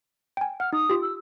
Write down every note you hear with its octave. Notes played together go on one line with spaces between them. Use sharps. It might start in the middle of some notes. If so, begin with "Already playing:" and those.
G5 G#5
F#5 F6
D#4 D#6
F4 G4
E6